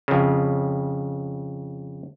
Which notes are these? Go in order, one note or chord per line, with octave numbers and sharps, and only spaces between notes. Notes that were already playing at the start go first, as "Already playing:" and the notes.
F2 C#3